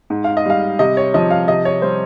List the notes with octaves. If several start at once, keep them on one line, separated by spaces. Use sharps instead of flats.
G#2
F5
D#5
G3 F5
C3 D#5
C#5
F3 D#5
F5
C3 D#5
C#5
G3 C5